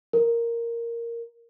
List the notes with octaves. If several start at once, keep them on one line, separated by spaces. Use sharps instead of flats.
A#4